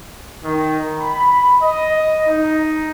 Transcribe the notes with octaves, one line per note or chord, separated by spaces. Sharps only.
D#3
B5
D#5
D#4